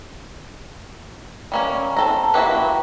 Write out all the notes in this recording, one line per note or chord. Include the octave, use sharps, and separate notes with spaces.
G3 A#3 C#4
C4 A4 A#5
A#3 E4 F#4 G4 B4